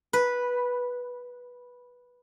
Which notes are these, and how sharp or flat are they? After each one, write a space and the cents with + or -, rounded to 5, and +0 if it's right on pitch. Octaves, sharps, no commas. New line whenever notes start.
B4 -10